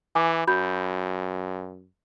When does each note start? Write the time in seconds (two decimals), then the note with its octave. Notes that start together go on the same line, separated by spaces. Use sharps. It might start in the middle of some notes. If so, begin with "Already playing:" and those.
0.15 E3 G#5 D6
0.47 F#2 F#4 B5 G6